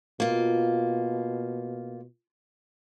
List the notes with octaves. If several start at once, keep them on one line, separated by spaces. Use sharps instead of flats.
B2 A#3 F4